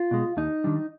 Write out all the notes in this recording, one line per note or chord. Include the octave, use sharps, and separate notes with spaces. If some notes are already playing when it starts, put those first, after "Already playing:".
Already playing: F4
B2 G#3
D#2 D#4
D#3 G3 D4